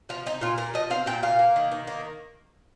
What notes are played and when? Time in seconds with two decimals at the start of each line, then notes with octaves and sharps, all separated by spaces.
0.09 F3 F4
0.26 C4 D#4
0.41 A#2 F4
0.57 A#2 A#4
0.74 F3 D#5
0.90 C4 F5
1.06 A#2 G5
1.23 A#2 F5
1.39 A#3
1.56 D#3
1.72 D#3
1.87 A#3